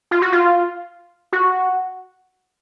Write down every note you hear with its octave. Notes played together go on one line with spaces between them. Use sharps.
F4
F#4
F4
F#4